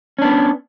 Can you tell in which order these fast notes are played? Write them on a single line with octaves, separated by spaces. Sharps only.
C#4 D4 B3